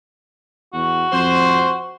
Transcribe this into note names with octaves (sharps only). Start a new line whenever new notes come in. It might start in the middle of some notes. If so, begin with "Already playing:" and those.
E2 F#4
F2 C5